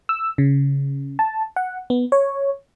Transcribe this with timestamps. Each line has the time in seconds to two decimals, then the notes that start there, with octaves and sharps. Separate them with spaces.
0.09 E6
0.38 C#3
1.19 A5
1.56 F#5
1.90 B3
2.12 C#5